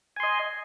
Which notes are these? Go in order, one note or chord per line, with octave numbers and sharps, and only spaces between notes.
D#5 G#5 C6